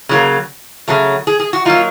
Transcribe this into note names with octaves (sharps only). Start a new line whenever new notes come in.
C#3 F#3 A#3
C#3 F#3 A3
G#4
G#4
F#4
F#3 A#3 D#4 F4